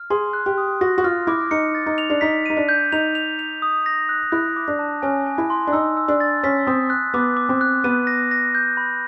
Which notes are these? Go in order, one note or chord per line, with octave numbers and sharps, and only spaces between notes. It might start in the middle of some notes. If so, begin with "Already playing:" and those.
Already playing: F6
G#4 C6
F#6
G4
D#6
F#4 A#6
F#4
F4 F6
E4 D6
D#4 C#7
A6
D#4
F7
D4
D#4 B6
D#4 D#7
D4
G6
D#4 F7
F7
F7
D#6
A#6
F#6
E4 F#6
D6
D4
A5
C#4 G#5
G#5
E4
C6
D4
D#4 E6
E6
D4
A6
C#4 B6
C4 D#6
F#6
B3 D6
D6
C4
F#6
B3 D#7
A#6
A#6
G6
B5